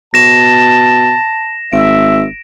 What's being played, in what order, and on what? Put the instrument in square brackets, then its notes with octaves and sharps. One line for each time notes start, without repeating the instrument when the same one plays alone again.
[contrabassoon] B2 [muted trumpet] A5 [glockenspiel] A#6 E7
[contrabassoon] G#1 [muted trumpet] E5 [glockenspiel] D7